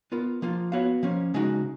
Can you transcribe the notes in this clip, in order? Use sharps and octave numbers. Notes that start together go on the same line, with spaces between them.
B3 F4 A#4
F3 A#3 F4
B3 F#4 C#5 F5
F3 A#3 C#4
C#3 G#3 D#4 F#4